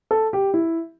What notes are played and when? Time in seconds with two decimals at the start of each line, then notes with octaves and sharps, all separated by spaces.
0.11 A4
0.33 G4
0.54 E4